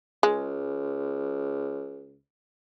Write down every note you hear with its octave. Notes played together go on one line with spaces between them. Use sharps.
C#2 G#3